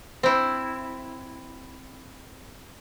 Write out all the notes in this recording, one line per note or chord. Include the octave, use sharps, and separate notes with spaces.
C4 E4